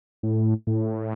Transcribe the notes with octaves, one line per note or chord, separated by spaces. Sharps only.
A2
A2